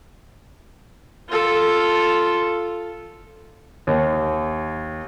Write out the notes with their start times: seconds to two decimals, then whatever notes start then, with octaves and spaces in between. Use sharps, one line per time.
1.29 F4 A4
3.87 D#2